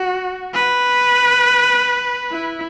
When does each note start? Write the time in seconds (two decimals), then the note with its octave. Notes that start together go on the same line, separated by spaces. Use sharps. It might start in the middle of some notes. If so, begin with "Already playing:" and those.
Already playing: F#4
0.54 B4
2.31 E4